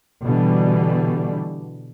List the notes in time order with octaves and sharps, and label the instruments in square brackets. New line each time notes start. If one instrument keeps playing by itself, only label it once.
[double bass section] B2 D3 E3 G3